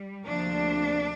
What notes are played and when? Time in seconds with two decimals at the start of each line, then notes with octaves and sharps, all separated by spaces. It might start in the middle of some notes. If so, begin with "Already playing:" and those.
Already playing: G3
0.25 D2 C3 F3 A#3 D4